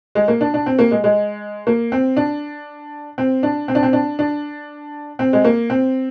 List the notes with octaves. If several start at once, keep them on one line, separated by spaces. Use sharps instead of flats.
G#3
A#3
D4
D4
C4
A#3
G#3
G#3
A#3
C4
D4
C4
D4
C4
D4
C4
D4
D4
C4
G#3
A#3
C4